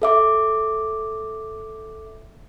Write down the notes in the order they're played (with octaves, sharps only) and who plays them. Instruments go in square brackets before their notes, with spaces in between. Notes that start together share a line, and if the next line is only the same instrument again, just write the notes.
[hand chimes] A4 E5 D6